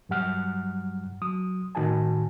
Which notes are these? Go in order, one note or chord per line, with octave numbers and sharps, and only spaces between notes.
G2 F#3 G3 F#5 F6 F#6
F#3 D#6
A2 D#3 F#4 G#5 A5